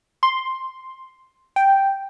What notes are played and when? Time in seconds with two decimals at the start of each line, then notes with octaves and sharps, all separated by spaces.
0.23 C6
1.56 G5